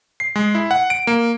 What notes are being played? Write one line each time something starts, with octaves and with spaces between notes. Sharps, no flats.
C7
G#3
E4
F#5
D7
A#3